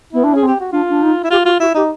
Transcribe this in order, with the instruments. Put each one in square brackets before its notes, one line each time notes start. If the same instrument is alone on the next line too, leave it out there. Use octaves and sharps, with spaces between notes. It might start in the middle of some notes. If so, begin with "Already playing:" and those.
[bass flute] B3 [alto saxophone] E4
[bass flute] D4
[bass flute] C#4 [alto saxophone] G#4
[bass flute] C4
[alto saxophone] G4
F#4
[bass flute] D4 [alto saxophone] F4
[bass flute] D4
D#4
[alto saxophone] E4
[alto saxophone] F4 [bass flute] G4
[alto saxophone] F4 [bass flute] F#4
[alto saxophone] E4 [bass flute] F#4
[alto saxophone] D#4 [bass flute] G4